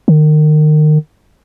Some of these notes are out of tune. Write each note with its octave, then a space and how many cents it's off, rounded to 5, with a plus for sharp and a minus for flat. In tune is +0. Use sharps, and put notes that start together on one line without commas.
D#3 -30